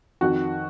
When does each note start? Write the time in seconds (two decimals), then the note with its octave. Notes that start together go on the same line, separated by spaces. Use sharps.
0.21 F2 D#3 F#4